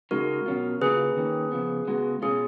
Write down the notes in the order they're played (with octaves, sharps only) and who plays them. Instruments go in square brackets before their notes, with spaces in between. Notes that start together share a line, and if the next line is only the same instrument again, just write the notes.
[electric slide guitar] C#3 G#3 D#4 [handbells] F#4 A#4
[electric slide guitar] B2 F#3 C#4 F4
[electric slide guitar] C#3 F#3 A#3 F4 [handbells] G#4 B4
[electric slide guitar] D#3 A#3 C#4
C#3 F3 B3
C#3 G#3 B3 F#4
[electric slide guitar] B2 G#3 C#4 F4 [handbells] G#4